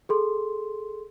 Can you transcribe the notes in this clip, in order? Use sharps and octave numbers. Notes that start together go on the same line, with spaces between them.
G#4 A4 C6